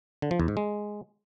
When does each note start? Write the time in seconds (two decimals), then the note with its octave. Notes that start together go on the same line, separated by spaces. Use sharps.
0.22 D3
0.31 F3
0.40 E2
0.48 G#2
0.57 G#3